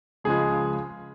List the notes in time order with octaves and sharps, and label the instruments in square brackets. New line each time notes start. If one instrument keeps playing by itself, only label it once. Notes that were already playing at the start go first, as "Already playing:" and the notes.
[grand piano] C#2 C#3 F3 G#3 G#4